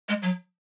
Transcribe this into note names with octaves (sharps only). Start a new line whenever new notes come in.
G#3
F#3